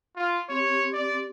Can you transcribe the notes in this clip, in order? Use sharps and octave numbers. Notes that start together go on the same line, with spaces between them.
F4
C4 G4 C#5 C6
D5